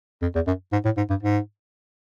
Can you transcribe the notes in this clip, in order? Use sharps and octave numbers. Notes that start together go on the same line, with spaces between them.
F2
E2
F#2
G#2
A2
G#2
G2
G#2